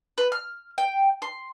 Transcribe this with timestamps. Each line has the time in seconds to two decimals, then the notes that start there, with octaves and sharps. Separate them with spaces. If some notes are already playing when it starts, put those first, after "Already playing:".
0.18 B4
0.32 F6
0.78 G5
1.22 C6